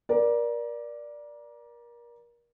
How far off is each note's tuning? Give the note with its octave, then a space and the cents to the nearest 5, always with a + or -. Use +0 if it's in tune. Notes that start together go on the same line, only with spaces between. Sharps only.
A#4 +30 D5 +0